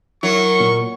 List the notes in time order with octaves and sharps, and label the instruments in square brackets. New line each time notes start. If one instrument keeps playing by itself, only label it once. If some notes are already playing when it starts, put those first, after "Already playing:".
[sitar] F#3 [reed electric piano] E4 [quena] A#4 [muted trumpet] C#6
[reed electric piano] A#2